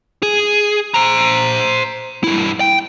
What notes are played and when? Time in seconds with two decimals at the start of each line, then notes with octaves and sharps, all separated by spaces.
0.23 G#4
0.94 C5 A#5
2.24 G2 E4
2.60 G5